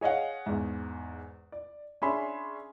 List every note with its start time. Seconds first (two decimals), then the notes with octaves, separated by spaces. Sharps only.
0.01 G#4 C#5 D#5 F5 F#5
0.46 E2 G#2
1.52 D5
2.02 C#4 D4 G#4 E5 B5 C6